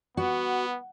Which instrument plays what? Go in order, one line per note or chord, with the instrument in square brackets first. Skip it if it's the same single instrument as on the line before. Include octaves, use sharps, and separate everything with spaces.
[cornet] B3 [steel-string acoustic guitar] F#4